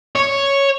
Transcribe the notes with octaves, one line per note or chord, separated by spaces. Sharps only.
C#5